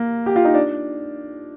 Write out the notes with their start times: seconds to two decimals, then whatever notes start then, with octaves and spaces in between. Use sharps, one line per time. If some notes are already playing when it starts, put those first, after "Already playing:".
Already playing: A#3
0.26 G4
0.36 F4
0.45 D#4
0.54 D4